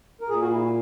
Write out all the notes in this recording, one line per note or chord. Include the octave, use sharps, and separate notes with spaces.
A#4
A#2 G#4
F#4
E4